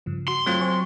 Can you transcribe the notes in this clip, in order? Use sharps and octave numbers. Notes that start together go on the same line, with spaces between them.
G2 C#3 F3
F#4 C6
F#3 A3 C4 F4
C5 G#5 C#6